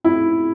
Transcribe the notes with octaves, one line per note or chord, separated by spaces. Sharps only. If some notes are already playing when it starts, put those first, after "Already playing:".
E4